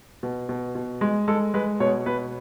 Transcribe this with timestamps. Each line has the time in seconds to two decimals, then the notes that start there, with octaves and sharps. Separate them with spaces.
0.23 B2
0.49 B2
0.75 B2
1.01 G#3
1.28 G#3 A4
1.54 G#3 B4
1.80 B2 C#5
2.06 B2 B4